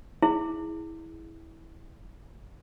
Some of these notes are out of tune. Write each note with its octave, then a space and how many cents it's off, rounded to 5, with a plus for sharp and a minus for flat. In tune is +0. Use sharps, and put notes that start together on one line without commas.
E4 -20 G#4 +0